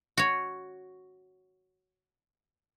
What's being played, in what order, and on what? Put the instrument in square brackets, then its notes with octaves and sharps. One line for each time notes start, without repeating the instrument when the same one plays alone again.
[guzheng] F#4 C#5